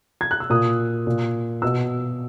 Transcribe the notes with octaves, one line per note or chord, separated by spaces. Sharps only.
G#6
F#6
E6
A#2 D#6
A#2
B2 E6